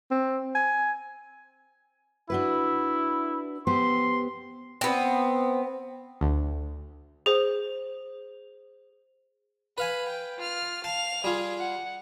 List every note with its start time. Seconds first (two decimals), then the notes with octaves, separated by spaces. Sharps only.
0.11 C4
0.55 G#5
2.30 D4 E4 F#4 B4
3.67 B3 G4 C5 C6
4.81 B3 C4
6.21 D2
7.26 G#4 C5
9.78 B4 F5 G#5 B5
10.08 G5
10.38 F4 F6
10.84 F5 A5 F7
11.24 G3 F4 G#4
11.58 F#5